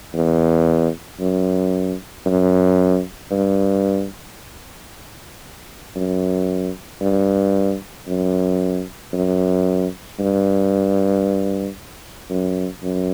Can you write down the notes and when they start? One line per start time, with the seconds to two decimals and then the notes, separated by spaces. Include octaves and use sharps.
0.14 E2
1.20 F#2
2.26 F#2
3.31 G2
5.96 F#2
7.01 G2
8.07 F#2
9.13 F#2
10.19 G2
12.30 F#2
12.83 F#2